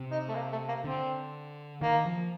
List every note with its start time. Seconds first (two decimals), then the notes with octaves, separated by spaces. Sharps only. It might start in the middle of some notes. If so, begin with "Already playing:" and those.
Already playing: C3
0.11 D#4
0.28 A3
0.35 A#3
0.52 A3
0.68 A#3
0.84 D3 C4
1.81 D#3 A#3
2.06 F3